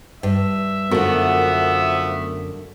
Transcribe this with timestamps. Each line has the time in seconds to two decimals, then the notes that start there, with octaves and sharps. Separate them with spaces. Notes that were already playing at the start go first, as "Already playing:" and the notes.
0.23 G2 E5
0.91 F#2 D3 F3 A3 B3 F#4 A4 A#4